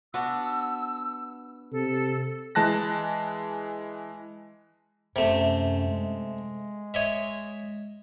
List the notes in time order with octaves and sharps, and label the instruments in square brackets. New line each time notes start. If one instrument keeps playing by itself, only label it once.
[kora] B3 D4 F#4 [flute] E6
[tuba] C3 [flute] A4
[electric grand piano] E3 G#3 A5 F#6 A#6
[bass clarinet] F#2 [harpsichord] C3 A3
[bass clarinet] G#3
[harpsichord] C#5 D#5 E5